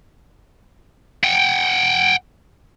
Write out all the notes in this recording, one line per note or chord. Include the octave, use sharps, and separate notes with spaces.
F#5 G5